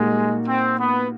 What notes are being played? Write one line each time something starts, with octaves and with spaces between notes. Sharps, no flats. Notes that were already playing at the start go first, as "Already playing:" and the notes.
Already playing: A#2 G3 G#3 A#3 D#4 F#4
C4
B3